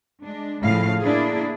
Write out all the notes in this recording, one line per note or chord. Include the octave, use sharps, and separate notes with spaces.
G#3 D4
A2 C#3 F3 F5
A#3 D4 E4 G#4